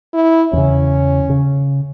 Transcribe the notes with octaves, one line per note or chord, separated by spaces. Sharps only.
E4
E2 C#3 C#4
C#3